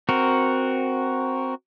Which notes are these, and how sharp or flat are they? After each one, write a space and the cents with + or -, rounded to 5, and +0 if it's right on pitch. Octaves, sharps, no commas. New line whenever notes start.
C4 +0 F#4 +0 A#4 +0